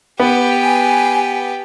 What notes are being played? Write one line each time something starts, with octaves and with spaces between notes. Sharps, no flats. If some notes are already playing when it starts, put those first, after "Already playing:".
B3 G4 B4
G#5